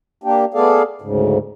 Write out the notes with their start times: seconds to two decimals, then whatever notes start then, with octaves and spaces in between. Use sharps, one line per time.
0.24 A#3 D4 G4
0.54 A3 B3 G#4 A4 D5 F5
1.02 D2 G#2 C#3